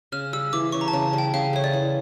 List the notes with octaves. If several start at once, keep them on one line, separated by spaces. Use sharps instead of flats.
C#3 F6
G3 E6
E3 D6
C#3 C#6
A#5
A5
C#3
G3
G5
C#3 F5
A3 C#5
D5
E3